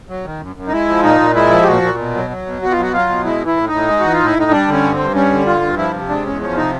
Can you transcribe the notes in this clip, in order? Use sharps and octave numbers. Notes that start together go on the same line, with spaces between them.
F#3
D#3
F#2
F#2
D#4
G#3 E4
F3
A#2 D#4
A#2
G#3 E4
F3
G4
A#2 F#4
A#2
B2
F#3
F#3
B2
B2 F#4
F4
F#3 F#4
F#3 F4
B2
G#3 E4
E3 E4
A2
A2 D#4
G#3
E3 F#4
F4
A2
E4
A2 D#4
G3 D4
D3
C#4
G2
C4
G2
G3 C#4
D3
G2 F4
G2
F3 E4
C3
G#3 D4
E2 C#4
F3 C#4
C3 D#4